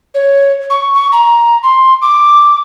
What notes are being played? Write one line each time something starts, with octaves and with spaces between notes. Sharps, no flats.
C#5
C#6
C#6
A#5
C6
D6